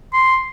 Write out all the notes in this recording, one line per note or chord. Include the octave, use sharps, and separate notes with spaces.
C6